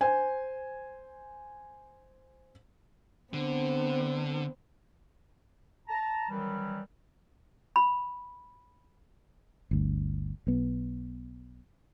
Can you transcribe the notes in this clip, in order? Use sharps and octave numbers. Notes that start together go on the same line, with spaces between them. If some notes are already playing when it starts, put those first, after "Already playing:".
C5 G#5
D3 B3 C4 C5
A5 A#5
F#2 D#3 E3 F#3 G3
B5
G1 D2
B1 B3